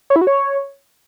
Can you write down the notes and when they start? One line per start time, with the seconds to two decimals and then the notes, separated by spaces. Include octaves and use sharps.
0.10 C#5
0.16 E4
0.21 F#4
0.27 C#5